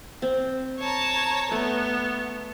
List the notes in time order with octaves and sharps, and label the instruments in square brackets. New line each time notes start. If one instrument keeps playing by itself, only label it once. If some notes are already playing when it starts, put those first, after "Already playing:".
[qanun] C4
[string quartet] C#5 A5 A#5
[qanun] A3 [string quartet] B3